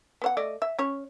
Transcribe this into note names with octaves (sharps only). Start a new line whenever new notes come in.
B3 C5 F#5
A3 D5 D#5
E5
C#4 C#5